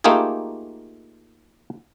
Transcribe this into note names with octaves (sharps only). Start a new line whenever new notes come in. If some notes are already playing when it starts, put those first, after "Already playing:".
A3 A#3 D#4 F4 G4 G#4